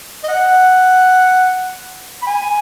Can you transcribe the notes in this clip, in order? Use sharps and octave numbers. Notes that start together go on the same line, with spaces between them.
D#5
F#5
B5
G#5